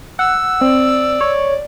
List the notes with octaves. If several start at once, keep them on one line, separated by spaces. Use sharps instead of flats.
F#5 E6
C4 D5
C#5